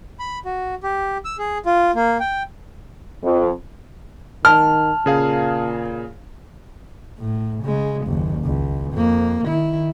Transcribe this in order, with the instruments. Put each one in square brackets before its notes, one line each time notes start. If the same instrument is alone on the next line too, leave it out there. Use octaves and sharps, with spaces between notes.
[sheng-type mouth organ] B5
F#4
G4
E6
G#4
F4
A#3
G5
[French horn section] F2
[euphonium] D#3 [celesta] A5 [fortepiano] F6
[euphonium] A#2 [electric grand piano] C#3 G#4 F5
[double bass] A2
C#3 G#3
F#1 D#2
C#2
F2 A#3
D#3 E4